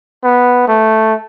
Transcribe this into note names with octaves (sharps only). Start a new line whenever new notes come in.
B3
A3